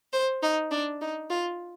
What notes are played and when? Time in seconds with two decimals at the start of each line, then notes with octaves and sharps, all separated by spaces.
0.13 C5
0.42 D#4
0.71 D4
1.01 D#4
1.30 F4